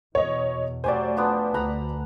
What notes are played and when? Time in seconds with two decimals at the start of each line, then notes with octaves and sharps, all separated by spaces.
0.15 E2 B2 C#5 D#5
0.84 F#3 A3 G4 C5 D5 G#5
1.17 F3 B3 D4
1.54 D2 F#5 A#5 B5